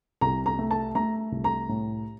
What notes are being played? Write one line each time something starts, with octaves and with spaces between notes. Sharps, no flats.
C2 A#5
A#5
A3
A5
A3 A#5
C2
A#5
A2